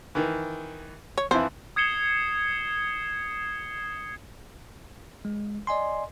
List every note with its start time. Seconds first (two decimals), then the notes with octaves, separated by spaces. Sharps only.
0.15 D#3 E3
1.18 C#5
1.31 F2 E3 E4 C5
1.76 D#6 G#6 C7 C#7 E7 G7
5.25 G#3
5.67 D5 D#5 G#5 C6